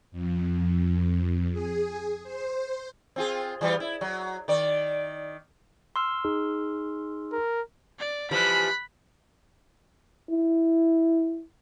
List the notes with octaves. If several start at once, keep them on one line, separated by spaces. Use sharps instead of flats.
F2
G#4
C5
C4 F4 G#4
E3 G3 F4
E4
F#3
D#3 D5
C6 E6 F6
D#4 G#4
A#4
D5
E3 F3 G3 B5 F#6
E4